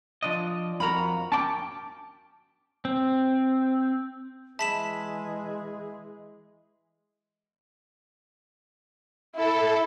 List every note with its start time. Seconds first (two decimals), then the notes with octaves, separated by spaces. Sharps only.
0.23 F3 D4 D#5
0.80 F2 F#4 A#4 A#5 B5
1.32 C#4 G5 A5 D6
2.85 C4
4.59 E3 G#3 G#4 E5 A5 B5 B6 E7
9.37 E4 A4